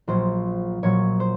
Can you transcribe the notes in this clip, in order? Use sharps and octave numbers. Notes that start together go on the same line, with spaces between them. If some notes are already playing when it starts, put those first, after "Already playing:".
A#1 A#2 F#3 C5
A#1 A#2 F#3 C#5
C5